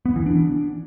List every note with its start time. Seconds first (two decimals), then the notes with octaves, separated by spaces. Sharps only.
0.06 B3
0.16 E3
0.26 D4